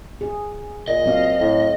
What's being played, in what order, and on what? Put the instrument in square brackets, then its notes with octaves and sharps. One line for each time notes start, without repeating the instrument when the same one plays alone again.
[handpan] G#4
[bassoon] A#2 [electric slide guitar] D#5
[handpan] F#3 C4 F5
[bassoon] A2